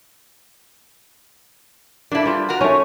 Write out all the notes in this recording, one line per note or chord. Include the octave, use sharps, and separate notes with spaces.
A#3 D4 E4 A4
G3 F4 B4
F#4 A#4
A3 C#4 D#4